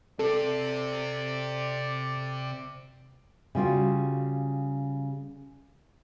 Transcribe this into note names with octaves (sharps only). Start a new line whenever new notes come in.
C3 C4 A4 D5
C#3 G3 F4 F#4